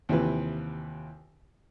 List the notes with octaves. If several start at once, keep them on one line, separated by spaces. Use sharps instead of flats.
D#2 C3 E3 F3 B4